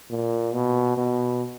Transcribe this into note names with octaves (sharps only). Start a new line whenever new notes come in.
A#2
B2
B2